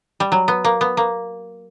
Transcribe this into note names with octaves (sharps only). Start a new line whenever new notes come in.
G3
F#3
B3
A#3
B3
A#3